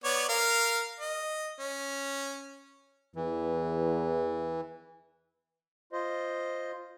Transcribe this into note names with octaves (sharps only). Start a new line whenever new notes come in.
B3 C#5 D5
A#4 F5
D#5
C#4
E2 E3
F4 C5 D#5